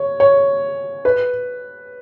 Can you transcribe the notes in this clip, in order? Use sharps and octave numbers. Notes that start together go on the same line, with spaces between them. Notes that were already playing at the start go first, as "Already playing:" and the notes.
Already playing: C#5
C#5
B4